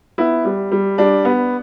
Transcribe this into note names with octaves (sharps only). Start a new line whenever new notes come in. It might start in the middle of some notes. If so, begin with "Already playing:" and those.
B3 E4
G3
G3
G3 D4
B3